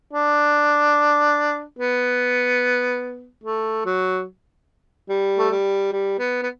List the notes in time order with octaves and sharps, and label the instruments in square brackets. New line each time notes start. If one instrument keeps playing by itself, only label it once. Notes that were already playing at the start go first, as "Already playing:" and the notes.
[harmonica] D4
B3
A3
F#3
G3
A3
G3
G3
B3
B3